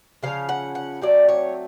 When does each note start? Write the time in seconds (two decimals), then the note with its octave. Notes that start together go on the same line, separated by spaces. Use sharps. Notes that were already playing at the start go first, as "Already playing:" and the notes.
0.23 C#3 F3 C#4 F5
0.49 F#5
0.75 F#5
1.02 F#3 A3 C4 D5
1.29 C#5